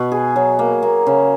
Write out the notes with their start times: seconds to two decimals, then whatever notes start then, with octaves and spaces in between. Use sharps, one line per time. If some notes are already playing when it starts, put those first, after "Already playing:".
Already playing: B2
0.12 G#4
0.36 F#3
0.59 A#3
0.83 A#3
1.07 C#3